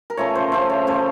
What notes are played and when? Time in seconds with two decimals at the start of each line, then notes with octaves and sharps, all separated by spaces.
0.10 A#4
0.17 C#3 F3 A3 C#5
0.35 C5
0.52 C#3 F3 A3 C5
0.70 C#5
0.87 C#3 A3 C5